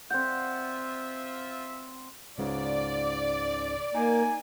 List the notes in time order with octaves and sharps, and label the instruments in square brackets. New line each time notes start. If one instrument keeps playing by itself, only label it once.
[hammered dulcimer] C4 D5 F#5 [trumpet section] F4 E5 [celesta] G6
[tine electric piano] C#2 G#2 C#3 [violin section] D5
[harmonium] A#3 [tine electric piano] D#4 [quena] G#5